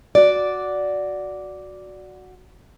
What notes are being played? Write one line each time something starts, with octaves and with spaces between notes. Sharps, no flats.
F#4 D5